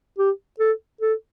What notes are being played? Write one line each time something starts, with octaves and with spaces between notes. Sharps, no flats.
G4
A4
A4